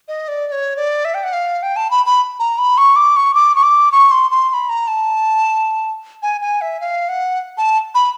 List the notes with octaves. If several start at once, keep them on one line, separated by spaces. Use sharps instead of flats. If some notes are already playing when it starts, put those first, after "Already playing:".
D#5
D5
D5
C#5
D5
E5
G5
F#5
F5
G5
A5
B5
B5
A#5
B5
C#6
D6
C#6
D6
C#6
D6
C#6
C6
C6
C6
B5
A#5
A5
G#5
G#5
E5
F5
F#5
A5
B5